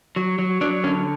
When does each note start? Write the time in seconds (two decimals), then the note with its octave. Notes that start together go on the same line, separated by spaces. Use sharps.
0.16 F#3
0.39 F#3
0.61 F#3 D4
0.84 D3 C#4